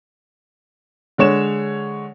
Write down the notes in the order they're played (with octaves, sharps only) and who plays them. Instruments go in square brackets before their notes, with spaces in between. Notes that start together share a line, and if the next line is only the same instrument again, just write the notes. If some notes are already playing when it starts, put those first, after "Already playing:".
[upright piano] D3 G#3 C#5 E7